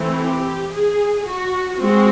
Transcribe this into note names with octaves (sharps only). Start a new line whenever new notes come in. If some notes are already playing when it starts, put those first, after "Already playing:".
Already playing: E3 A3 C4
G4
G#4
F#4
G#3 C4 F#4